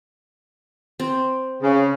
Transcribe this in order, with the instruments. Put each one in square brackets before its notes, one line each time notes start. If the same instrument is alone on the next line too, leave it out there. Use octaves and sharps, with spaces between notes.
[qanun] C4
[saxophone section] C#3